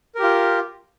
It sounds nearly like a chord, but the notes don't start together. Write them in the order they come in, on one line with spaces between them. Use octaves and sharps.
A#4 G4 F4